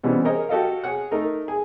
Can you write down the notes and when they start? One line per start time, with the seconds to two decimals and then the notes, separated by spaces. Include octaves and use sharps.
0.04 B2 E3 G3 C4 C#4
0.25 G#4 A#4 C5 C#5 D#5
0.49 F#4 G4 A4 D#5 F5
0.84 G#4 C#5 F#5
1.11 A3 D#4 A#4
1.48 G#4